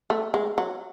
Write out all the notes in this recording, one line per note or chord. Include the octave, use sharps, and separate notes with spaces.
A3
G#3
F#3